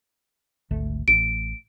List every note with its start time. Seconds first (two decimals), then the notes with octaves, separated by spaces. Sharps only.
0.71 G#1 D2 A3
1.08 A1 D7